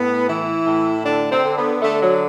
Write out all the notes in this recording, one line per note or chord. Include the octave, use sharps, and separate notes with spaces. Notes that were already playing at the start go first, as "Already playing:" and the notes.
Already playing: A2 B3
E3 E4
A2
D3 D4
C4
D3
B3
D3 A3
F#3